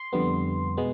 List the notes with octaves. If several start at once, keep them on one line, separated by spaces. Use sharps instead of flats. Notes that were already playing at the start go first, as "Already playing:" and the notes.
Already playing: C6
F2 D3 G3 B3
B2 G#3 B3